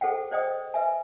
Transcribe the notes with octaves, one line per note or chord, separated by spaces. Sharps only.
G#4 A4 C5 F#5 G5
C5 D5 D#5 G5 D#6
B4 E5 G#5